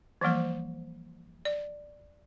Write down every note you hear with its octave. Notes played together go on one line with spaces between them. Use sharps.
E3 F3 G3 A#3 C5
D5